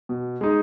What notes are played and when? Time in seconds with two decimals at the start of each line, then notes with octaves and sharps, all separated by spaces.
0.09 B2
0.41 G#3 D#4